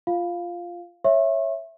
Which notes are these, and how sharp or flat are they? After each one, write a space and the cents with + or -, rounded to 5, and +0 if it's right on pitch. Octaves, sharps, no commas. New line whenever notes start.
F4 -5 F5 +0
C#5 -10 E5 +0 C#6 -45